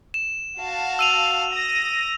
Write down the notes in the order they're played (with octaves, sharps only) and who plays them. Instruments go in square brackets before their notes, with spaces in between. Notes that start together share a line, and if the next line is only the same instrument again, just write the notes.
[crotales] E7
[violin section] F#4 F5 A5
[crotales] E6 D#7 F7
[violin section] D#6 A#6